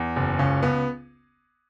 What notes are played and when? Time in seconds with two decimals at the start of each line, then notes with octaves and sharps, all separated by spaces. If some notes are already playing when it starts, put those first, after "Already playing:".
Already playing: E2
0.16 F#1
0.39 C#2 C#4
0.63 C#2 B3